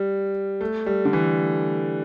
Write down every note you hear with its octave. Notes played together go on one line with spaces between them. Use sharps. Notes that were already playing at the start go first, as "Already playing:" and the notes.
Already playing: G3
A3
G3
D3
E3